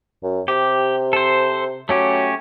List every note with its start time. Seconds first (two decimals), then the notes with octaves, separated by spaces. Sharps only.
0.23 F#2
0.48 C3 G4
1.13 A4 C5
1.89 F#3 A3 C#4 G4